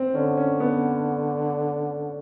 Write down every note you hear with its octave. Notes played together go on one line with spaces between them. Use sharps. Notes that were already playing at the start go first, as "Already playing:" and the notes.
Already playing: C4
D3 C#4
C#4
B3